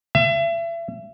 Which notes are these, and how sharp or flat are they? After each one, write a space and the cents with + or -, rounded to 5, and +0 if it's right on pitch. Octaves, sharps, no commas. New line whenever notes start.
E5 +35